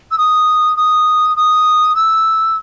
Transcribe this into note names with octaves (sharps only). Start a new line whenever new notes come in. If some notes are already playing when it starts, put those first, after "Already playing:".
E6
D#6
D#6
D#6
E6